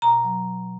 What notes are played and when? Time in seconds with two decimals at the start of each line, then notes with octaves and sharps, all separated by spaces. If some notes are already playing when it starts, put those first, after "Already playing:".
0.02 B2 A#5
0.24 F#3